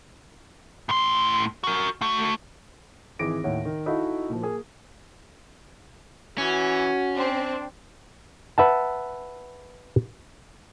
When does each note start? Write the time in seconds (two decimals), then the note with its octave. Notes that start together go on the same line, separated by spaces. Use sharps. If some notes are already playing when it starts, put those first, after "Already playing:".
0.89 A2 C6
1.64 F#4 A#4
2.01 A3 F#4
3.19 G#1 E3 G#4 D6 A#6 D7
3.44 D#2 A2 C#5 F#5
3.65 D#3
3.86 D#4 E4 F#4 A4 D#5 F5
4.29 A#2 F3
4.42 A#3 G#4
6.38 E3 C#4 F#4
7.16 C4 D4
8.58 B4 E5 F#5 A5